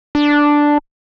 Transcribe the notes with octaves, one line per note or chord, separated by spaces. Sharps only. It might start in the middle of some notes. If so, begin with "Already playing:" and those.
D4